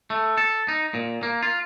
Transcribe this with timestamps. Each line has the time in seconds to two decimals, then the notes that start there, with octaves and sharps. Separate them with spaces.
0.10 A3
0.37 A4
0.68 D#4
0.94 A#2
1.23 A#3
1.43 F4